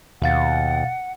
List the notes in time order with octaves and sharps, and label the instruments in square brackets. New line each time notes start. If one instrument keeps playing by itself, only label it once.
[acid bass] D#2 [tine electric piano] B2 F5 A6 [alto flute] F#5